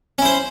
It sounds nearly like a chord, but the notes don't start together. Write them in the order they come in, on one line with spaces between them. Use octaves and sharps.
C#4 E4 C5